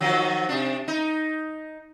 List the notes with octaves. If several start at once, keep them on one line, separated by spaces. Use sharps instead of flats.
D#3 F3 F#3
C3 D4
D#4